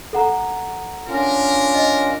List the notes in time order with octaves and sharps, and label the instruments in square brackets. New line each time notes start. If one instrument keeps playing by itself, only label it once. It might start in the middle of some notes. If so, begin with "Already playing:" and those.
[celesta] A4 F#5 A#5
[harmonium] C#4 D4 F4 [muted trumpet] A#4
[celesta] D#5